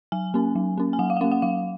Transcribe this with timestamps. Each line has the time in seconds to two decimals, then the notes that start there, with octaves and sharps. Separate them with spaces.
0.12 F#3 G#5
0.34 A#3 C#4
0.55 F#3
0.78 A#3 C#4
0.93 G#5
0.99 F#3 F#5
1.10 F5
1.17 F#5
1.21 A#3 C#4 F5
1.32 F#5
1.42 F#3 F5